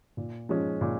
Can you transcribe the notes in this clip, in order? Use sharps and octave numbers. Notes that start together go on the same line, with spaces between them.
A#2
F3 G#3 C#4
A#2